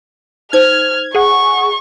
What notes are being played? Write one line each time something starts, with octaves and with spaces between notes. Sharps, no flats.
D#4 C5 F6 G#6
G#4 F#5 C#6